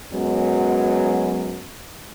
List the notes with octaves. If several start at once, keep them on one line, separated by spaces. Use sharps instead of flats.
F#2 F#3 G#3 B3